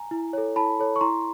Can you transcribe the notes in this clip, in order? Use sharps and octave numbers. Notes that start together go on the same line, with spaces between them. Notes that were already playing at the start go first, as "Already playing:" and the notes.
Already playing: G#5 A#5
E4
A4 C#5
E4 A5 B5
A4 C#5
C#6
E4 A#5 C6